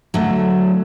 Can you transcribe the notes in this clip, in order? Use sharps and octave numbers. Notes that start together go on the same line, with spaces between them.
D3 F#3 A3